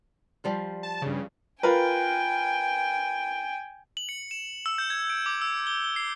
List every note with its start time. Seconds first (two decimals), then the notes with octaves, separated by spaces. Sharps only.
0.44 F3 G3 F4
0.83 A5
1.02 G2 C#3
1.63 F4 A#4 B4 G5 G#5
3.97 F#7
4.09 C#7
4.31 E7
4.66 E6
4.78 G6
4.90 G#6
5.10 D7
5.26 D6
5.42 E6
5.67 G7
5.84 G7
5.96 C7